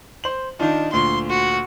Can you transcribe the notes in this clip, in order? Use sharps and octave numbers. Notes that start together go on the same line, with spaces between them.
C5 F#7
D#3 D4 D#4 F4
D2 A#2 C6
F#4